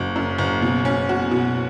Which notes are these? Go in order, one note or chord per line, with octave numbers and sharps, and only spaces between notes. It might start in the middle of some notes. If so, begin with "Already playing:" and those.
Already playing: F#1 F#3
F#2
F#1
B2
C#4
F#4
B2